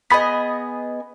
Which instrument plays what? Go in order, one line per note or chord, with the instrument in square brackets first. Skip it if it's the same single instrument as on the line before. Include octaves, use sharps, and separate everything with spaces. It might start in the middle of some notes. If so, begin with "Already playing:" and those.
[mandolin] B3 G#4 D#5 [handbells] B5 B6